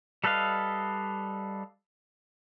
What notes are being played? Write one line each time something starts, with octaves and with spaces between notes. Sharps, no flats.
G3 A4 B4 D#5 F5